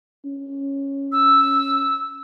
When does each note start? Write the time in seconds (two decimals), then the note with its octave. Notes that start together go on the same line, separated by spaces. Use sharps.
0.25 C#4
1.12 E6